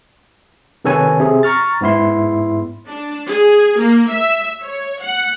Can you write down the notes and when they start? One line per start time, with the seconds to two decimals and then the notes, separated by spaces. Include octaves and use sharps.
0.85 C3 D#3 A4 B4 C#5 G#5
1.20 C3 G#4
1.43 A#5 C#6 F6 A6
1.81 G#2 B3 E4 C6
2.87 D4
3.28 G#4
3.78 A#3
4.10 E5
4.62 C#5
5.00 F#5